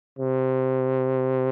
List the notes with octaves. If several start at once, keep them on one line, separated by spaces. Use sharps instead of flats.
C3